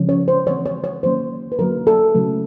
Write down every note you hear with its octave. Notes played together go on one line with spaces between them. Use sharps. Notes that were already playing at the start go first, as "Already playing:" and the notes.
Already playing: C#3 F3 G#3 C#4
C#5
C5
E3 G#3 C4 C#5
C#5
C#5
D#3 F#3 A#3 C#4 C5
B4
D3 F#3 A#3 A#4
A4
C#3 F#3 A3